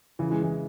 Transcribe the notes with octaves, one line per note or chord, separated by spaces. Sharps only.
C#3 E3
E3 G#3
E3 G#3